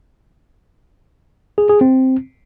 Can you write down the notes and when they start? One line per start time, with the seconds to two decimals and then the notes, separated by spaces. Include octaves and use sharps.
1.58 G#4
1.69 G#4
1.81 C4